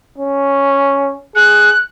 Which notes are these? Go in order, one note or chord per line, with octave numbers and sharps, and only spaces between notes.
C#4
G#4 F#6